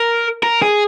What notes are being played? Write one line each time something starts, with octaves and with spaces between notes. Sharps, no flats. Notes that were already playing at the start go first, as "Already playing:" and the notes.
Already playing: A#4
A#4
G#4